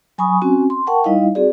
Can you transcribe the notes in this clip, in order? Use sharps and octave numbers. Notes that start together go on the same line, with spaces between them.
F#3 G#5 B5 C#6 D#6
C4 C#4 F#4 G#5
C6
A#4 F#5 G5 A5 C#6
G3 D#4 E4 D#5 F5
C4 F#4 G#4 D5